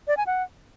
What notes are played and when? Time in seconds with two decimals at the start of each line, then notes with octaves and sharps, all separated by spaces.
0.08 D5
0.17 G#5
0.27 F#5